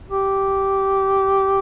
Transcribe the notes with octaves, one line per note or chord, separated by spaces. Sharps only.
G4